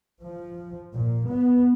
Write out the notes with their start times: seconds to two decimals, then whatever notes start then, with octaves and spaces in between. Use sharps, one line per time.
0.23 F3
0.94 A#2
1.31 B3